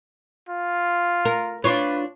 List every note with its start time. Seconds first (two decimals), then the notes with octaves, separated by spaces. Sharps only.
0.49 F4
1.25 A#4
1.64 D4 F4 B4 C#5